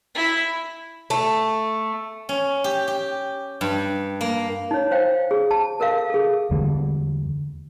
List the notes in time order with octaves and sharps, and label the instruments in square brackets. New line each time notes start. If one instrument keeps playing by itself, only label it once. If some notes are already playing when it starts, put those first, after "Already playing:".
[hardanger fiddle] E4
[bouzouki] A3
[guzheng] C#4
G4
G4
G2
A#3
[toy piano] D#4 C#5
C5 F5 G5
G#4
A5
A4 A#4 E5 F5
G#4 A4
[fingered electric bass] E2 D3 G3